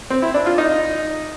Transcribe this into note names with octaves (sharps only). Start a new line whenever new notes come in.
C4
E4
D4
F4
D#4